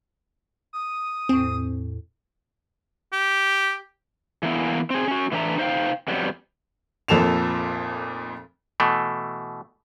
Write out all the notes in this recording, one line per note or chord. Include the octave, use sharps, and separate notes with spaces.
D#6
E2 A2 C4
G4
E3 A#3 B3 E4
C4 G#4
C#4 F#4
A2 E3 D4 C5 E5 A#5
D#4 C5 E5 F5 G5
F2 F#3 G3 B3
F1 F2 A#2 A4 E7 F7
B2 E3 A3